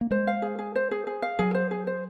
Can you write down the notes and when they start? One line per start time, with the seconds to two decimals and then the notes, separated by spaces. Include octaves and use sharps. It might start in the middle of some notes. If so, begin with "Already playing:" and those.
0.01 A#3
0.11 G#3 C5
0.27 F5
0.42 G#4
0.59 G#4
0.75 C5
0.91 G#4
1.07 G#4
1.22 F5
1.39 F#3 G#4
1.54 C5
1.71 G#4
1.87 C5